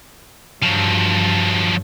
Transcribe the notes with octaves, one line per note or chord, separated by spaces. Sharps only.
G2 F3 F#3